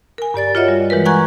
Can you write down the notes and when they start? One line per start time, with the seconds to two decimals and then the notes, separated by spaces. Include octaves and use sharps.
0.18 A#4 G#5
0.34 G2 G4 D5 A6
0.55 F4 F#4 C#5 D#5 E5 F#5
0.68 G3
0.90 E3 G#3 A#4 B4
1.05 F#5 G#5 A#5 C#6 F#6 G#6